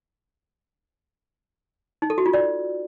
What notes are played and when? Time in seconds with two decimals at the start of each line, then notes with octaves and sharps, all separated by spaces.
2.02 D#4
2.10 A4
2.18 F#4
2.26 F4
2.33 D5